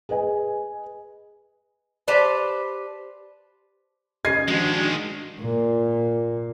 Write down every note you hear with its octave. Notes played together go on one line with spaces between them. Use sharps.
G#4 B4 D#5 G#5
G4 B4 C5 D5 A5
C#3 D#5 G#6 C7
D#3 F3 G#3 D4 F#4
A#2